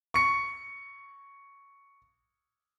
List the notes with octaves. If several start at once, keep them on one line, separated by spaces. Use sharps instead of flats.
C#6 C#7